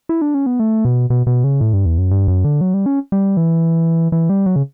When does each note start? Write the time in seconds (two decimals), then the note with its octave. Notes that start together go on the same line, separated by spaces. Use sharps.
0.09 E4
0.22 D4
0.34 C#4
0.46 B3
0.59 A3
0.85 B2
1.10 B2
1.27 B2
1.44 C#3
1.61 A2
1.73 G2
1.86 E2
1.98 F#2
2.11 G2
2.28 F#2
2.45 D3
2.61 F#3
2.74 G3
2.86 C#4
3.12 G3
3.37 E3
4.12 E3
4.30 G3
4.46 F#3
4.56 C#3